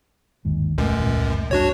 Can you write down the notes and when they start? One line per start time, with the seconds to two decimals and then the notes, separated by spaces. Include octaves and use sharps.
0.45 G1 D#2 G#2
0.78 E1 C#2 F#2 A#2 A3
1.32 F#1
1.51 C#2 G2 D4 F#4 C#5